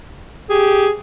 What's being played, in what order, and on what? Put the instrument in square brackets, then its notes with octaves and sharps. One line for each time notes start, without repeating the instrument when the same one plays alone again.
[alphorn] G4 [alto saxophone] G#4